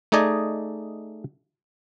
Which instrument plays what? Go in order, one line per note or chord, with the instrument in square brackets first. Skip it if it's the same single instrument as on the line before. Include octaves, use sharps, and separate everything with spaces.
[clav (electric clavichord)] A3 D#4 G#4 D5 D#5 G#5